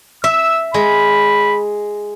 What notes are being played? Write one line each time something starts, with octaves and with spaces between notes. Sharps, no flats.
E5 E6
G#3 B5